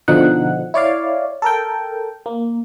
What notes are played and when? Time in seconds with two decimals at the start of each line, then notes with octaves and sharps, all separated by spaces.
0.08 B2 D3 F3 D#4 F#5
0.74 E4 C#5 D5 F5
1.42 A4 A#4 G5
2.26 A#3